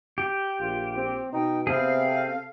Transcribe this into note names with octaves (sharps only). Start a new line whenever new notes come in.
G4
A#1 F4
C4
B2 D#4 G5
C3 B3 C4 G#4 F5
A4